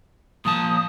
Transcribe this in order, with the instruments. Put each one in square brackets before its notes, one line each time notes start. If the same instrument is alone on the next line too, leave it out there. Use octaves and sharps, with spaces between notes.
[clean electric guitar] A#2 F3 A5 [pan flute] D#6